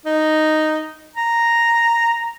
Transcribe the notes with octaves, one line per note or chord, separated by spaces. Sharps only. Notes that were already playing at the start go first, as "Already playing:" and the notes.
D#4
A#5